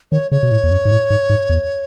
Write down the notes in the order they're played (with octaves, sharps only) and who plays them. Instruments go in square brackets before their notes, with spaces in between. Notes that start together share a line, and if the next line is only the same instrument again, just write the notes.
[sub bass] D#3 [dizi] C#5
[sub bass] C#3 [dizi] C#5
[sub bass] B2
A2
E2
F#2
G#2
A2
G#2
G#2
E2